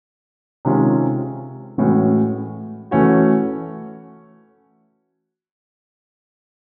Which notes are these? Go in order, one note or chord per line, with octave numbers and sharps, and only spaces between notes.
C3 D#3 G#3 C#4 F4
A2 E3 G#3 C#4 F#4
E3 A3 C#4 F#4